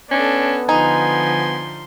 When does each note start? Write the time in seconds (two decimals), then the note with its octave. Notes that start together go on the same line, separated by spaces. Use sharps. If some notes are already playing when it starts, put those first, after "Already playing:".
0.11 B3 C#4 D4 A4
0.69 D3 F3 D#4 G#5 C6